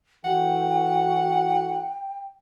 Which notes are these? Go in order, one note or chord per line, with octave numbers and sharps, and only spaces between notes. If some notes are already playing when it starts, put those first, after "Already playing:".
E3 A3 F#4 F#5 G5